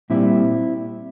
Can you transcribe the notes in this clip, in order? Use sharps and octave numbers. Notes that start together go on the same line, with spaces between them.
A#2 G3 C4 E4